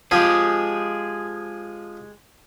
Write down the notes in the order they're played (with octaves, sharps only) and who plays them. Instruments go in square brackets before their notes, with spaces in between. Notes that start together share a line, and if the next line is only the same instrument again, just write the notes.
[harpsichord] F3 C4 [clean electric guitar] G#3 G4 G#4